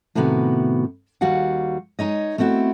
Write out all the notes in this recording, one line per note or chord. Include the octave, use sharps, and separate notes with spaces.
A2 C3 D#3 B3 F#4
D#2 G3 F#4 F5 F#5
G#3 D#4 C#5 D#5
A3 B3 C4 E4 F#4